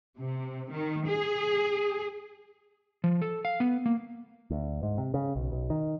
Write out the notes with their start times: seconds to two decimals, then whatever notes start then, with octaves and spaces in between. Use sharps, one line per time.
0.19 C3
0.70 D#3
1.07 G#4
3.04 F3
3.22 A4
3.45 F5
3.60 B3
3.86 A#3
4.50 D2
4.83 G#2
4.98 C3
5.14 C#3
5.36 B1
5.52 B1
5.70 D#3